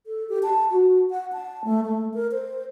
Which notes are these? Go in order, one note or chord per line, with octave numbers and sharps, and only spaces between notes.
A4
G4
A5
F#4
F#5
A5
A3
A3
A#4
C5